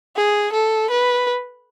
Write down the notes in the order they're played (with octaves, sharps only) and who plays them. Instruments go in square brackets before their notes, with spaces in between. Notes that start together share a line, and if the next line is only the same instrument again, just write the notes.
[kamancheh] G#4
A4
B4